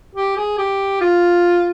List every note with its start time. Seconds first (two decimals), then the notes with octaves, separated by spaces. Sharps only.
0.16 G4
0.37 G#4
0.58 G4
1.01 F4